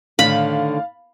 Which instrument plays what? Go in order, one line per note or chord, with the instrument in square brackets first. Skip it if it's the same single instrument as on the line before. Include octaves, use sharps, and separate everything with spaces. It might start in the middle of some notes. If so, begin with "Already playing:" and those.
[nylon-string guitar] A2 D3 D#3 [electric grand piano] F5 [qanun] B5